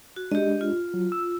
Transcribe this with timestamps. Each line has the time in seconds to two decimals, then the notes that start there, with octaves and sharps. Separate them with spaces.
0.16 F#4
0.32 G#3 D4 G4 D#5
0.61 F4
0.94 F#3
1.12 E6